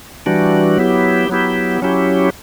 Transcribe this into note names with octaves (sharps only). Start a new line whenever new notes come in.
E3 G3 D4 F#4
F#3 B3 E4 G4
F#3 B3 E4 G4
F#3 C#4 E4 G4